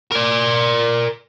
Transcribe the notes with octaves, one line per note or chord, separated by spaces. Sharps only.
A#4 D5